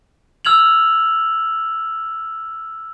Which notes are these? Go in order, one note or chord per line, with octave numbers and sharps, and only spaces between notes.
E6 F6 G#6 F7 F#7